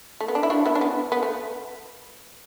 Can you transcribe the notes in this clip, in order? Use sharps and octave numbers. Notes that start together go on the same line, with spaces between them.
A3
B3
D4
E4
D4 F#4
B3 E4
D4
B3
B3
A3